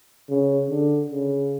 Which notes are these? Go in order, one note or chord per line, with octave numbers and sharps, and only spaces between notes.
C#3
D3
C#3